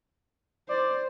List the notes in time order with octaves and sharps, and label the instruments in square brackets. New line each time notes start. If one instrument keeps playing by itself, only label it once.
[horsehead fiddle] C5 [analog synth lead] D5